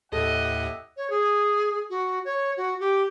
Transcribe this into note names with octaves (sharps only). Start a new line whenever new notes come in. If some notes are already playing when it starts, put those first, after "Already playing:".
D#2 A2 G4 A4 D#5 E5 F#5
C#5
G#4
F#4
C#5
F#4
G4